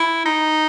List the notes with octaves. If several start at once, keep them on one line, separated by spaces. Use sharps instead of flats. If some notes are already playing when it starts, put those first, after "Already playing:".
Already playing: E4
D#4